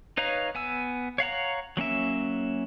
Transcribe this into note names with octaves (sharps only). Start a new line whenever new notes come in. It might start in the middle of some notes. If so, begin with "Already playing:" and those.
D#4 B4 C#5 F5 A#5
B3 G#5 E6
C#5 F5 F#5 A#5
F#3 A#3 C#4 E5